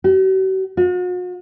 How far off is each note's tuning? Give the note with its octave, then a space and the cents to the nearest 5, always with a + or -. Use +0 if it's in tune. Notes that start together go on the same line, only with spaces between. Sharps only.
F#4 +45
F#4 -45